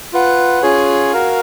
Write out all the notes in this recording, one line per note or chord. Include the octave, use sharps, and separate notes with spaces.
F4 B4 F#5
C#4 F4 G#4 C#5
F#4 A#4 F5